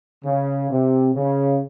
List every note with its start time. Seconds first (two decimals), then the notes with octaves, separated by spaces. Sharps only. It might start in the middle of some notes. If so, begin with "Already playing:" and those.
0.24 C#3
0.69 C3
1.15 C#3